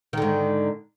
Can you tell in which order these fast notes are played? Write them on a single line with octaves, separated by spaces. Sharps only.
D#3 D3 G#2